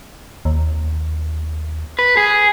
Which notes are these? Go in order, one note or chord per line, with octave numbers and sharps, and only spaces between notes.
D#2
B4
G#4